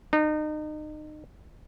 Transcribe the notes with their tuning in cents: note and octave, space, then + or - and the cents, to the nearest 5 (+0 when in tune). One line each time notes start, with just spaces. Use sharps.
D#4 -30